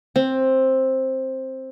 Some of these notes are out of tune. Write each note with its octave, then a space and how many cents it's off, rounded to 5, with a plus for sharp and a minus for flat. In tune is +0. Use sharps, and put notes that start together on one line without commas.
C4 +10